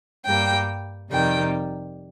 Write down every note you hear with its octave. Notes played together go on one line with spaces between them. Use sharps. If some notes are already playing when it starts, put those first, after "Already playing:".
G2 G3 A#3 G5
F2 C3 D#3 G3 G5